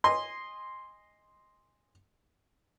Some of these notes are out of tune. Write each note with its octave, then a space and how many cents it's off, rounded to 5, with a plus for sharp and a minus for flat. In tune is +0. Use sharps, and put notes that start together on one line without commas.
D#5 +0 G#5 -20 C6 +0